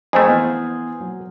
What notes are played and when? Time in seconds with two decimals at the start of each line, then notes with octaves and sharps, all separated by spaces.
0.13 F2 A3 G#4 C5 D#5 F5 A#5
0.25 E3 B3 F6
1.00 F#3